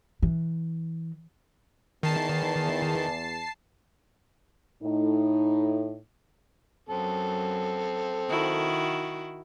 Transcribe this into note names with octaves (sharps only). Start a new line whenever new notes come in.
E3
E2 D#3 A5 C7
A2 D#4
F#2 C4 A4
D#3 E4 F#4